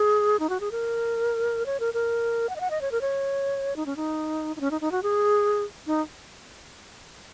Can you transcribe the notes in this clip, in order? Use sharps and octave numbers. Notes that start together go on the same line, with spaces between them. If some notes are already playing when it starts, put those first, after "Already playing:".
Already playing: G#4
D#4
F#4
G#4
A#4
C#5
A#4
A#4
F#5
D#5
F#5
D#5
C#5
A#4
C#5
D#4
C#4
D#4
D#4
C#4
D#4
D#4
F#4
G#4
D#4